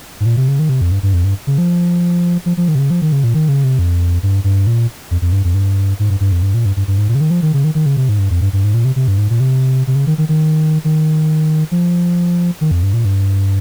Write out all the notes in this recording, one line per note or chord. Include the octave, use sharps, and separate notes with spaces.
G#2
A#2
C3
C#3
D#3
C3
F2
G2
G2
F2
G2
C#3
F3
F3
F3
D#3
C3
C#3
F3
D#3
C#3
A#2
D#3
C#3
C3
F2
G2
G2
A#2
F2
F2
G2
F2
G2
G#2
G2
G2
F2
G2
A#2
G2
G2
G2
G#2
A#2
C#3
D#3
F3
D#3
C#3
D#3
D#3
C#3
C3
G#2
G2
F2
G2
G2
G#2
A#2
C3
C3
G2
G#2
A#2
C3
C3
C#3
D#3
D#3
D#3
D#3
F3
D#3
F2
G2
A#2
G2